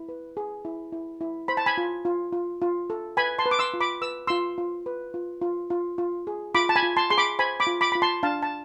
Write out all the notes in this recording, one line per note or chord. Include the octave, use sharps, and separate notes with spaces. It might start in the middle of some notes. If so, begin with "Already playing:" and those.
Already playing: E4
B4
G#4
E4
E4
E4
C5 B5
A5
G#5 B5
F4
F4
F4
F4
A4
B4 G#5 B5
A5 C6
B4
D6
C6 E6
F4
B5 D6
B4 E6
F4 C6 E6
F4
B4
F4
F4
F4
F4
G#4
F4 B5 D6
A5
G#5 B5
F4
A5 C6
G#4 C6
B5 D6
C5 G#5 B5
B5 D6
F4
B5 D6
F4 B5
A5 C6
D4 F5 A5
A5